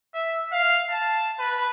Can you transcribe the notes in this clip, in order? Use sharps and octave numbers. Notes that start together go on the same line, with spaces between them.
E5
F5
A5
B4